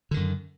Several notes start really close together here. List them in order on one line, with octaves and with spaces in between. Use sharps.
D3 D#3 F#2